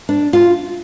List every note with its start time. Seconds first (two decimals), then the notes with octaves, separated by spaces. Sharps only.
0.09 D4
0.33 F4